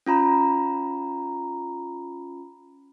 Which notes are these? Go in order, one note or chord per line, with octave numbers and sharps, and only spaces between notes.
C#4 F4 A#5 B5